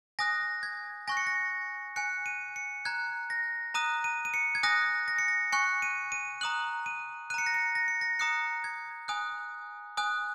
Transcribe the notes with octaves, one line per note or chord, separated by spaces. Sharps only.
G#5 D#6 F#6 A#6
G#6
G#5 C#6 F#6 A#6
C#7
A#6
G#5 F#6 C#7
D#7
C#7
A#5 F#6 G#6
A#6
A#5 D#6 F#6 D#7
D#7
D#7
C#7
G#6
G#5 D#6 F#6 A#6
A#6
C#7
A#6
G#5 C#6 F#6 C#7
D#7
D#7
A#5 D#6 F#6 F#7
D#7
A#5 F#6 C#7 D#7
A#6
C#7
A#6
C#7
A#6
A#5 D#6 F#6 C#7
G#6
G#5 D#6 F#6
G#5 D#6 F#6